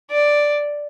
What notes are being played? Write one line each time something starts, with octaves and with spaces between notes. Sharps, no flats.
D5